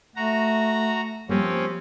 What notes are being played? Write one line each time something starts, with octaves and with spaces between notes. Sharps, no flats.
A3 F#4 A#5
F3 G3 A#3 C4 C#4